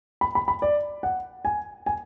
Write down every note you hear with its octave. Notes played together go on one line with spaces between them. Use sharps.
B5
B5
B5
D5
F#5
G#5
G#5